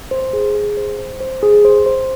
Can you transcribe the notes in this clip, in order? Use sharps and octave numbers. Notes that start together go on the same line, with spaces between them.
C5
G#4
G#4
C5
C5
C5
G#4
C5
C5